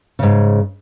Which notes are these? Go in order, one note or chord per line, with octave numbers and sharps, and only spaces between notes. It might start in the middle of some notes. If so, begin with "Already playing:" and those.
G#2 C#3